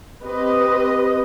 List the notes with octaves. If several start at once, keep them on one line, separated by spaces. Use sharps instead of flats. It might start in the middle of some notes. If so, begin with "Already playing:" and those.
C4 G4 B4 D#5